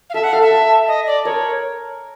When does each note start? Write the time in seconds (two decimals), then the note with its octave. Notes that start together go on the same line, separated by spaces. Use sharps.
0.10 F5
0.14 A4 E5
0.24 F#5
0.33 A4 F5
0.42 E5
0.51 A4
0.88 D#5
1.07 D5
1.25 A#4 C#5